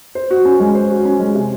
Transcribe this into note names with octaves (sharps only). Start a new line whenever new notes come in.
C5
F#4
C#4
G#3
C5
F#4
C#4
G#3
C3